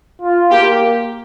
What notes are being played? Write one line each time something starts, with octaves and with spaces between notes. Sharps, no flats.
F4
A#3 G4